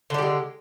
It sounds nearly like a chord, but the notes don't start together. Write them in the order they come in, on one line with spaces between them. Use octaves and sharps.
D3 G3 G4 G#3